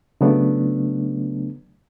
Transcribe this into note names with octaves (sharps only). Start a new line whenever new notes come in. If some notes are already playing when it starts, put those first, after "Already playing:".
C#3 F#3 A3 B3 D4